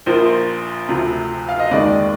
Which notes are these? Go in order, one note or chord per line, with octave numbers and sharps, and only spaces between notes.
A#1 A#2 F3 A#3 C5
D2 C3 F3
F5
D#5
F1 D#2 D#3 G#3 D5